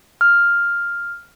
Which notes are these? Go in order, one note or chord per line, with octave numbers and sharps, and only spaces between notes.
F6